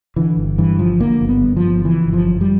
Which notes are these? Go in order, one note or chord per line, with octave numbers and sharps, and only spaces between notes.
D3 E3
G1
G2 E3
G1 F3
D3 A#3
G1
B3
G2
F3
G1
C#3 E3
G1
F3
F#2
G3